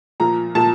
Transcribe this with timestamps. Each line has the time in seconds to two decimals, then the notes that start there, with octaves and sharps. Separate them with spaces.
0.20 A#2 F3 A#5
0.55 A#2 F3 A5